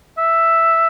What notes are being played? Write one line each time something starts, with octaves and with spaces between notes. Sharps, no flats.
E5